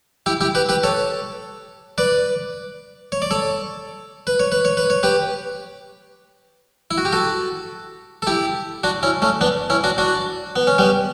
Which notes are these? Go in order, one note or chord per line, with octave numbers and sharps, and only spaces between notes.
E4 G4
E4 G4
G4 B4
G4 B4
A4 C#5
B4 D5
C#5
D5
A4 C#5
B4
C#5
B4
C#5
B4
C#5
G4 B4
E4
F#4
G4
F#4 A4
A4
E4 G4
D4 F#4
C#4 E4
A3 C#4
B3 D4
C#4 E4
D4 F#4
D4 F#4
B3
C#4
G3 B3